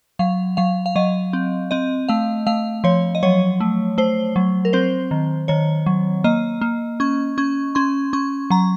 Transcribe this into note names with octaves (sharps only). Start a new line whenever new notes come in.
F#3 F5
F#3 F5
F5
F#3 D#5
C4
C4 D#5
A3 F5
A3 F5
F3 C#5
D#5
F#3 C#5
A3
A3 C5
F#3
A#4
C4 C5
D#3
D#3 C#5
F#3
A#3 D#5
A#3
C#4 C#6
C#4 C#6
C#4 C6
C#4 C#6
F#3 A#5